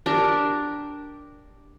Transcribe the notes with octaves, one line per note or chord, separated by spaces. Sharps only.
D4 G4 A#4